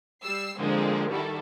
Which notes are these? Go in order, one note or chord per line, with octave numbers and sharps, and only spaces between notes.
G3 E6 C7
D3 F3 G#3 A#3 C4
D#3 G3 E4 F#4 A4